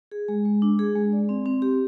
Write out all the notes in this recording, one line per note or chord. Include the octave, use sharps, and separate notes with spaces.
G#4
G#3
G#3
D4
G#4
G#3
D5
C4
C4
G4